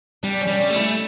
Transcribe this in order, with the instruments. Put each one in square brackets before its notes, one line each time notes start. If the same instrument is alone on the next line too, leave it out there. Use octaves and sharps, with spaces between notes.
[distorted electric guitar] G3 [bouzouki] D4
[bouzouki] C#4
[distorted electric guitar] G3 [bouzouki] D4
[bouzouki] C#4
[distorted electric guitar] A3
[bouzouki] E4